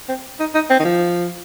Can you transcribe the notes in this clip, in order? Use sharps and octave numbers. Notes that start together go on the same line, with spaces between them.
C4
D#4
D#4
C4
D#3
F3